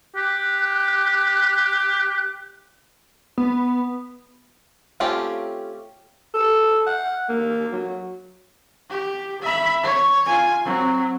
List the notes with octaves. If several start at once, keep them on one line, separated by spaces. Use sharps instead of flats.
G4 F#6
B3
A3 C4 C#4 F4 G4
A4
F#5
A#3
F#3
G4
E5 B5
C#5
F4 G#5
F#3 C4